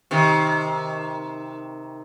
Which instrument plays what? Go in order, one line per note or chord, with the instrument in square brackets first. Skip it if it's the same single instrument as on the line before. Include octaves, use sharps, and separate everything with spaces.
[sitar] C3 D#3